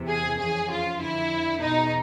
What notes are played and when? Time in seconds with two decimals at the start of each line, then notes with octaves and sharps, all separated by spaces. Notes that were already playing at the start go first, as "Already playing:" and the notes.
Already playing: E2 C3 E3
0.08 G#4
0.39 F2 C#3 E3 G#4
0.70 F4
1.00 F2 D3 E4
1.61 E2 B2 D#4